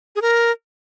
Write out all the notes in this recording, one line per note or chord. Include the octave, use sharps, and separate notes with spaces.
G#4
A#4